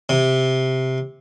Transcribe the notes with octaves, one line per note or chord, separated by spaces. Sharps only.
C3